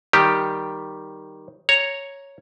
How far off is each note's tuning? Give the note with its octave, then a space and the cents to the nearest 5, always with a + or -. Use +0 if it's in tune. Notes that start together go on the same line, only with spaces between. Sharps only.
D#3 +0 G3 +0 G4 +0
C#5 +0 A#5 +5